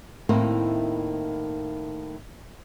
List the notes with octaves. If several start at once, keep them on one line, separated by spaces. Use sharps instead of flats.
A2 D#3 A#3 C4 D#4 E4